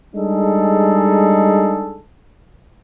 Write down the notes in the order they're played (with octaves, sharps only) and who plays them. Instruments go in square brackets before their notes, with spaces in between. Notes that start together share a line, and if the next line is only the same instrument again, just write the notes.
[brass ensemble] G3 G#3 D4 D#4 G#4 A4